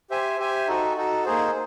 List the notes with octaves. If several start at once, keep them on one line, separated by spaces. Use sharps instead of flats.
G4 C5 E5 G#5
G4 C5 E5 G#5
D#4 F#4 A4
D#4 F#4 A4
A#3 D#4 G#4 C5